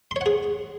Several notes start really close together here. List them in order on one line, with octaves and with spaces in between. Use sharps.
C6 C#5 F#5 G#4